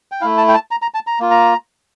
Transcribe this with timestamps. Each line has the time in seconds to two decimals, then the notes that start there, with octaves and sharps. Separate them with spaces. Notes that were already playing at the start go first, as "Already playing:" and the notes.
0.12 G5
0.21 A3 E4 F5
0.38 A5
0.48 G5
0.54 A5
0.71 A#5
0.82 A#5
0.94 A5
1.07 A#5
1.20 A#3 F4
1.31 A#5